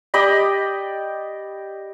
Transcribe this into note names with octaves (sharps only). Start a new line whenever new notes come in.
G4 D5 D#5 B5